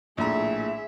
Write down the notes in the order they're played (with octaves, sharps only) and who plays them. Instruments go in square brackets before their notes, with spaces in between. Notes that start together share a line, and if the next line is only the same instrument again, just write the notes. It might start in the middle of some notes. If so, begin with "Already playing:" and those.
[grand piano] A#1 A2 A#5 [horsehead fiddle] G#4 E5